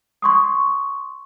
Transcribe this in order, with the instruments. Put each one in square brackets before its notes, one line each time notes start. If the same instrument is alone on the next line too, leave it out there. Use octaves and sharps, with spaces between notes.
[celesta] C6 C#6 D#6